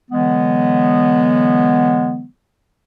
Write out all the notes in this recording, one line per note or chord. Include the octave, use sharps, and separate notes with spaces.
D3 E3 F#3 G#3 B3